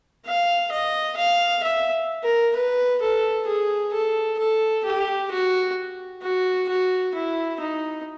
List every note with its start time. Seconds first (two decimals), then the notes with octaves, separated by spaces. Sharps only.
0.26 F5
0.71 D#5
1.17 F5
1.63 E5
2.24 A#4
2.56 B4
3.02 A4
3.47 G#4
3.93 A4
4.39 A4
4.84 G4
5.31 F#4
6.22 F#4
6.69 F#4
7.14 E4
7.60 D#4